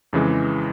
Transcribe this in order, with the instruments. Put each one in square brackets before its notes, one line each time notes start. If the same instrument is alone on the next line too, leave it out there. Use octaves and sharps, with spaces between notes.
[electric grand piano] F2 C#3 E3 G#3